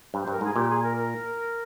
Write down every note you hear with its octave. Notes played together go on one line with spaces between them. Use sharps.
G2
C5
G2 A#4
G#2 G#4
A#2 G4
G#4
A#4
A#4